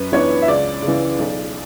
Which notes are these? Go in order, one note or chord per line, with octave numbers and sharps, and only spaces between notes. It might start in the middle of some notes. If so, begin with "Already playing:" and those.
Already playing: F#2 B4
E3 B3 D4 C#5
E5
C#2 D5
C#3
E3
B1